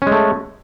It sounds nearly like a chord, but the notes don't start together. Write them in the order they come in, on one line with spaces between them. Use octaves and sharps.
C#4 G#3 A3